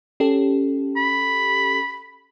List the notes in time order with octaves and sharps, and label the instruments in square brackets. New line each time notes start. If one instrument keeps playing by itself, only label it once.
[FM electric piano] C#4 G4 A4
[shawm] B5